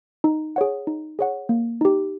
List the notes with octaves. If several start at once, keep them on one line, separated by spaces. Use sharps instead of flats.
D#4
G#4 C#5 F#5
D#4
G#4 C#5 F#5
A#3
D#4 G4